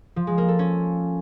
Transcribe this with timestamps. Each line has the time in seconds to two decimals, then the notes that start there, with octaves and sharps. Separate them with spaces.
0.16 F3
0.27 G#3
0.38 A#3
0.48 A4
0.59 C#4